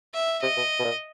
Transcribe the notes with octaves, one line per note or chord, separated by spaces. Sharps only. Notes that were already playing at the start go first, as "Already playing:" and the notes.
E5
C3 D#5
B2
B2
A#2